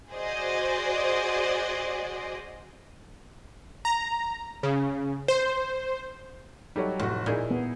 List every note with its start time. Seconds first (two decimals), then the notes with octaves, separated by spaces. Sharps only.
0.11 F#4 G#4 C5 D5 D#5
3.85 A#5
4.63 C#3
5.28 C5
6.76 F#3 G3 D#4 A4 C#5
7.00 F1 A2 F#4
7.26 A#2 D#4 E4 G#4
7.51 B3